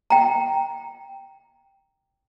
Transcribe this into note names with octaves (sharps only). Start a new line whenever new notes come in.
G5 A#5